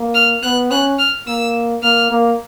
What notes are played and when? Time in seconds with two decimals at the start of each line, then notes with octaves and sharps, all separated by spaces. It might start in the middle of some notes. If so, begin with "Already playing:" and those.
Already playing: A#3
0.15 F6
0.43 B3 F#6
0.71 C#4 F#6
0.99 F6
1.27 A#3 E6
1.83 A#3 F6
2.11 A#3